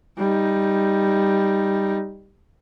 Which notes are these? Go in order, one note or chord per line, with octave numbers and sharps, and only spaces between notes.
G3 D#4